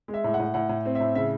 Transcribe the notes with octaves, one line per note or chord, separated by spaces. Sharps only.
G#3
E5
A2
F#5
A2
A2 F#5
A2
C4
E5
A2
C#3 E5